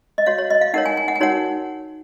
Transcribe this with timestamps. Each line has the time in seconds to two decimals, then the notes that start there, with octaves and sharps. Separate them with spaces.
0.18 D#5
0.26 F#4 C#5 F5
0.38 C#5
0.50 D#5
0.61 F5
0.74 D#4 A#4 C#5 F#5
0.86 G#5
0.97 G#5
1.08 F#5
1.16 G#5
1.20 D#4 F#4 A#4 C#5 F#5